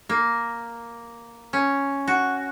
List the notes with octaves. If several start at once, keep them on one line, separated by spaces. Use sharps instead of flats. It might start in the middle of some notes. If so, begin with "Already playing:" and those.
A#3
C#4
F#4